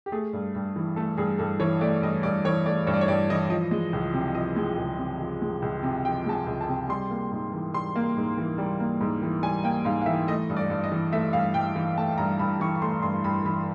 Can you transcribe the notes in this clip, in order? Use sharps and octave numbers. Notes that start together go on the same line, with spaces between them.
G4
A3 G#4
G2
G2
E3
A3 A4
G2 G#4
G2 A4
E3 C#5
A3 D5
G2 D#5
G2 D5
E3 C#5
A3 D5
G2 C#5
D5
C#5
G2 D5
E3 D#5
F3 D#5
G#3
C#2
C3
F3 D#5
G#3
C#2
C3
F3
G#3
C#2
C3
F3 G5
G#3 A5
G#5
C#2
A5
C3
G3 C6
A#3
G#2
E3
G3 C6
A#3
G#2
E3
G3
A#3
G#2
E3
G3 G#5
A#3 G5
G#2 F5
F5
E3 E5
A3 D#5
G2
D5
G2
D#5
E3
A3 E5
G2 F5
G2 G5
E3
A3 A5
G2 A#5
G2 B5
E3 C#6
C#6
A3 C6
G2 C6
G2 B5
E3 B5